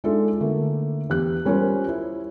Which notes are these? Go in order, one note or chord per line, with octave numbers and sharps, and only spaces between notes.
G#3 D4 D#4 F4 A4 E5
D3 A3 A#3
E2 G4 F#6
G3 C#4 F4 G4 A#4 C5
E4